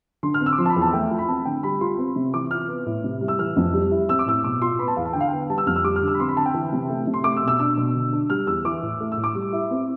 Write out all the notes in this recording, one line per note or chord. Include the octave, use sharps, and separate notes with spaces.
D3 C6
F6
C4
E6
D6
F3 C6
A5
B5
E2
A5
A3 G5
F4
B5
C4 A5
D3 G5
G3 B5
F4 C6
C4
C3
E3 D6
F4 F6
B3
A2
C3
G3
E6
E3 F6
F2
G3
E4
C4 E6
D6
A2 E6
B2 D6
F4 C6
B3 B5
A5
E2 F5
A5
D3 G5
F5
B3 G5
G3 A5
E6
F2 F6
E6
G3 D6
F6
D3
E6
B5
C4 C6
B5
D3 A5
G5
E3
C3
A3
C3
C6
A3 D6
E6
B2
E6
D4 E6
B2
D3
D4
G3 F6
E2 E6
E3 D6
A2
A3
E6
A2
D6
G3
E4
C4